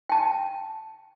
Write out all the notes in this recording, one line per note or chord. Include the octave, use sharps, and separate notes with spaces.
G5 A5